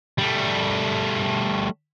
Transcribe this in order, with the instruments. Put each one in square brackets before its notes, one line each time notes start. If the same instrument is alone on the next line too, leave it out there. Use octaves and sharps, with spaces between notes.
[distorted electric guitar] G3 A3